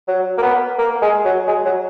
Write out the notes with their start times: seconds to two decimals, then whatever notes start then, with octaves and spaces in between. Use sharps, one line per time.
0.08 F#3
0.38 A#3
0.42 B3
0.78 A#3
1.02 G#3
1.25 F#3
1.48 G#3
1.65 F#3